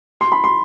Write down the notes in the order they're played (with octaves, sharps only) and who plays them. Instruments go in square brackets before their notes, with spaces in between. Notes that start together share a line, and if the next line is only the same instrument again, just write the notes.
[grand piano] C6
B5
C6